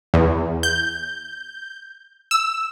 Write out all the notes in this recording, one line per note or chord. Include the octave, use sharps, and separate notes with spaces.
E2
G6
E6